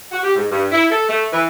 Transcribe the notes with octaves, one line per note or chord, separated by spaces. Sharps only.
F#4
G4
G#2
G2
E4
A4
A3
E3